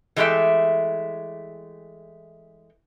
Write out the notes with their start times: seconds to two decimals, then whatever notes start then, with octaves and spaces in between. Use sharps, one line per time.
0.16 E3 G#3 A3 C#4 G4 E5